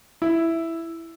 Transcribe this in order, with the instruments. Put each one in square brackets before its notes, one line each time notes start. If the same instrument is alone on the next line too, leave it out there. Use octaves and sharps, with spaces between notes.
[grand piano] E4